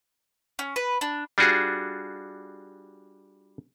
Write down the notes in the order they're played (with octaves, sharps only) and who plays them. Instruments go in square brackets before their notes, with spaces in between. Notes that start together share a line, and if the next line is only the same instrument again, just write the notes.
[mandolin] C#4
B4
D4
[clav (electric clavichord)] G3 D4 F4 F#4 G#4